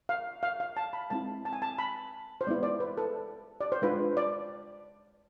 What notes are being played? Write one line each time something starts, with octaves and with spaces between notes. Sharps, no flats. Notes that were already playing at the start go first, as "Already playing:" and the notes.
F5
F5
F5
A5
B5
G#3 C4 E4 A5
A5
G#5
A5
B5
C5
G#3 B3 E4 D5
D5
B4
A4
D5
C5
G#3 D4 F4 B4
D5